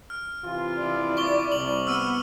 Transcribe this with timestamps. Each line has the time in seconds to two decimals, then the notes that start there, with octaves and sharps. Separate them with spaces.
0.10 F6
0.44 C3 E3 F4
0.77 E4 D5
1.17 C#6 D6 G7
1.52 C2 F#7
1.87 B3 E6 F6 D#7